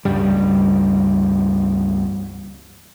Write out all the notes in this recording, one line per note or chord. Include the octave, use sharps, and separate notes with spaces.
C#2 G2 G3